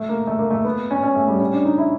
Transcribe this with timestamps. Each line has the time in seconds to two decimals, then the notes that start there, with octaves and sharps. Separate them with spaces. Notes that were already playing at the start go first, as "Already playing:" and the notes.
Already playing: A3
0.09 A#3
0.27 A3
0.39 A#3
0.50 A3
0.65 B3
0.91 C#4
1.03 C#4
1.15 A3
1.28 G3
1.40 C#4
1.53 D4
1.65 D#4
1.78 E4